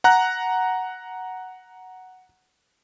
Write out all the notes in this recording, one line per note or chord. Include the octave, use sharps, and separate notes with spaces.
F#5 A#5 F#6